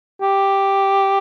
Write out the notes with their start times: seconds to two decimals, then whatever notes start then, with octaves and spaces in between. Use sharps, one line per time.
0.21 G4